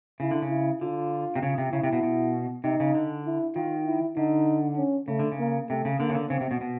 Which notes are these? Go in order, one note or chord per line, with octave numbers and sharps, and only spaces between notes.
C#3 E4
D3
C#3
E4
D3 F4
C3
C#3
C3
C#3 E4
C3
B2
B2
C3 D#4
C#3
D3
E4
D#3 F4
E4
D3 D#4
C#4
C#3 A3
D3
C#3
A#3
C3 A3
C#3
D3 A#3
C#3
D3
C#3 C4
C3
B2
B2